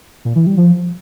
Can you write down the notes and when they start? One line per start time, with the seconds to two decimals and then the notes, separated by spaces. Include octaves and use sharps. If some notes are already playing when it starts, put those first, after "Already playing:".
0.25 A#2
0.36 E3
0.46 G3
0.57 F3